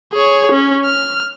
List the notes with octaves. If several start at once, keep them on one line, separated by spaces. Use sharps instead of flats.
G#4 C#5
C#4
F6